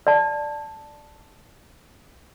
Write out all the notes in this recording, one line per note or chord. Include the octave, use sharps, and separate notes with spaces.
D5 A5